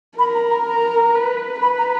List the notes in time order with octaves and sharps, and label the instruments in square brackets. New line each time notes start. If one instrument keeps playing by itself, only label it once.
[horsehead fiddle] A#4 [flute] B5
[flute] A#5
A#5
A#5
[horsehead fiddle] B4
[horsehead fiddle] B4 [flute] B5
[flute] A#5